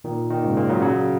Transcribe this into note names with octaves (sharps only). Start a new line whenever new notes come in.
A#2 D#3
A#2 D#3
G#2 C#3
A#2
C#3 F#3
C#3 F#3